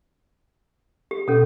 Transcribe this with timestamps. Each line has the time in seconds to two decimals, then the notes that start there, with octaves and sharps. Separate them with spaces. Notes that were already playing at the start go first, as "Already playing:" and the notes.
1.11 G4
1.28 B2 C#4 A4